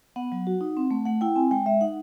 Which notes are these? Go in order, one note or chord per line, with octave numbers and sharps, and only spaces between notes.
B3 F#5
F#3
F#4
D#4
C4
A3
A3 F#5
E4 G5
C4 G#5
G#3 G5
G#3 E5
D#4 F#5